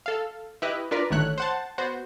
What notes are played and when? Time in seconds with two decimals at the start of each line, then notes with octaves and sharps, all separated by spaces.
0.06 A4 F5
0.62 E4 G4 B4 D#5
0.91 D4 F4 A#4 B4 D5
1.10 A1 D3 D#3 A3 C#5 F#6
1.38 C5 F#5 A5
1.78 B3 F#4 C5